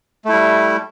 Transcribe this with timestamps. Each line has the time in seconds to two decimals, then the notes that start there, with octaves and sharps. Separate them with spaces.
0.25 A3
0.29 E4
0.33 G3